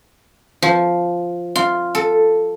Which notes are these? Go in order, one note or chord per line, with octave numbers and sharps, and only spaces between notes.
F3
F4
A4